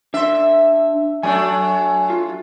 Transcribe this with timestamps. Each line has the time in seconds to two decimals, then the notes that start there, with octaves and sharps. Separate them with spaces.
0.14 D4 E5 C6
1.23 F#3 A3 D4 G#5
2.10 F4